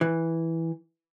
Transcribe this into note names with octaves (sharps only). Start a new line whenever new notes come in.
E3